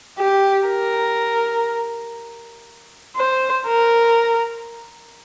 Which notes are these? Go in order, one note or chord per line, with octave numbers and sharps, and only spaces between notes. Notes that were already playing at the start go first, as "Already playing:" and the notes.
G4
A#4
C5
A#4